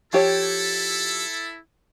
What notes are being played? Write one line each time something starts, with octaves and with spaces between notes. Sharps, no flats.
F3 E4 G4 A4 C#5